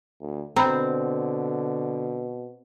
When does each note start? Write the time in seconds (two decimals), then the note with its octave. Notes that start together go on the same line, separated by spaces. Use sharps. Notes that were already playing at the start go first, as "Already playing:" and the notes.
0.20 D2
0.56 B2 D3 C4 A#5 B5